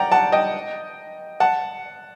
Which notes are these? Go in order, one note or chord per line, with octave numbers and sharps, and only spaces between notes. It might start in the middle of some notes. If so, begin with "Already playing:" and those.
Already playing: D5 F#5 G5 A#5
F#5 A5
D#5 G5
F#5 A5